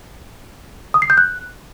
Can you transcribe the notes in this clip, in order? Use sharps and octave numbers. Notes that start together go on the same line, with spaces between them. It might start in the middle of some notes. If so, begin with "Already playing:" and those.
D#6
C7
G6
F#6